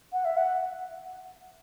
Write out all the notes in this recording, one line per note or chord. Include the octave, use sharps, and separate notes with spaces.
F#5
E5
F#5